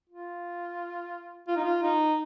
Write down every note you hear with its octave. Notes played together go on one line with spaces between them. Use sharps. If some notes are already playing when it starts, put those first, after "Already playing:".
F4
F4
D#4
F4
D#4